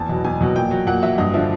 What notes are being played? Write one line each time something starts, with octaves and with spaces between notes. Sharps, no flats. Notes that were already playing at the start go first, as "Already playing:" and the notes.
Already playing: E2 A5
B2 F#3
E2 G#5
B2 F#3
A#2 G5
F#3
A#2 F#5
F#3 E5
G2 D#5
D3 F3 E5